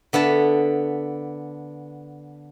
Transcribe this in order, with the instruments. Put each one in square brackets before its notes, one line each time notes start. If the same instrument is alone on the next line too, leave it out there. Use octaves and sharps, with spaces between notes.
[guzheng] D3 B3 E5 A5